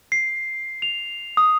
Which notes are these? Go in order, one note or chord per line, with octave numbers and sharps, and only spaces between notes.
C7
F7
D#6